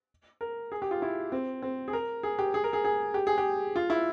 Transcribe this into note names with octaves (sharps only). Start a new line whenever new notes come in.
A#4
G#4
G4
F4
E4
C4
C4
G#4
A#4
G#4
G4
G#4
A#4
G#4
G#4
G4
G#4
G4
F4
E4